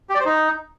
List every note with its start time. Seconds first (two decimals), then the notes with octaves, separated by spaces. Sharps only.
0.09 G4
0.15 D5
0.20 C5
0.25 D#4